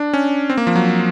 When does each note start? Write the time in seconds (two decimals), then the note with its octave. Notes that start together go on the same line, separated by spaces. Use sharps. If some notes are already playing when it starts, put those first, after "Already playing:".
Already playing: D4
0.13 C#4
0.50 C4
0.57 A#3
0.67 F3
0.76 F#3